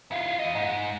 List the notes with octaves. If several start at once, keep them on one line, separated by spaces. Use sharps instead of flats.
E4 F4
E3 D#5
G#2